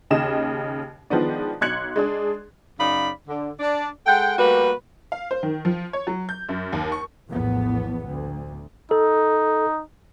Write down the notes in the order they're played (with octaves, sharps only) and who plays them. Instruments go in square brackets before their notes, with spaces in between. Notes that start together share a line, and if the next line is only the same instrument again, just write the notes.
[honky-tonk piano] D#2 C#3 D#5 E7
D#3 F3 G#3 B3 D4
B1 C6 F#6 G#6 C#7 F#7
G#3 D4 G#4
[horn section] F#2 C#3 D#4 D5 F5 B5
D3
D4 D5
G#3 A4 F#5 G5
G3 A3 A#3 F#4 B4
[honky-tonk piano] F5
C5
D#3
F3
C#5
F#3
G6
F#2
D#2
C#6
[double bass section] A#1 E2 A2 B3
D2
[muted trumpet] D#4 [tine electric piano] A4